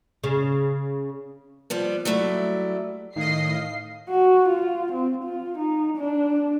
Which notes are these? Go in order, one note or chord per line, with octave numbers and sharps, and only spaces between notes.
C#3
F3 G3 B3
F#3 G3 A3 E4
A2 D#3 D#5 F5 C7
F#4
F4
C4
F4
D#4
D4